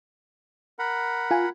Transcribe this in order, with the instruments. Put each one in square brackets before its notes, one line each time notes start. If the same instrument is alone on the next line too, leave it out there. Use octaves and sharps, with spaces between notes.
[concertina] A#4 F#5 B5
[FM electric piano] F4 G#5